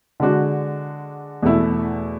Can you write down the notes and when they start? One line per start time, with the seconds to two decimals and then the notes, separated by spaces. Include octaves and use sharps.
0.20 D3 G#3 D4 F#4
1.42 E2 B2 A3 E4